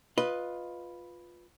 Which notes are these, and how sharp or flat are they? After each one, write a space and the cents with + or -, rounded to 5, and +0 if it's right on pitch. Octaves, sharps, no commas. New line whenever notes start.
F4 +10 B4 +0 D#5 +0